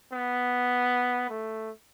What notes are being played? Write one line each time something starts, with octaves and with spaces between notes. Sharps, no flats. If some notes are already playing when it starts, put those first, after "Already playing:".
B3
A3